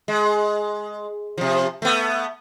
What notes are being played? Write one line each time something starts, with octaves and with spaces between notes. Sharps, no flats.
G#3
C3 F3
A3 B3